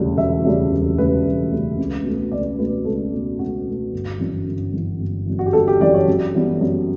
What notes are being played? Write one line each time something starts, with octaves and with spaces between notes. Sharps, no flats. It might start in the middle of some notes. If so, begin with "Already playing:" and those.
Already playing: E1 D2 C#3 G3
E1 E5
D2 C#3 G3
E1
D2 C#3 G3 B4
E1
D2 C#3 G3
C#2
B2 A3
C#2 D5
B2 A3 B4
C#2 A4
B2 A3
C#2 F#4
B2 A3
G1
F#2 E3
G1
F#2 E3
G1
F#2 E3
F#4
G4
G1 A4
G4
F#2 E3 D5
C#5
F#2
E3 G3 B3
F#2